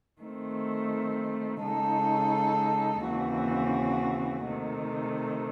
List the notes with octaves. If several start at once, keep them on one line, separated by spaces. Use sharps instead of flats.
D#3 A3 C4
C#3 G#3 D#4 A4
D#2 C#3 E3 C4 F#4
C3 D#3 A3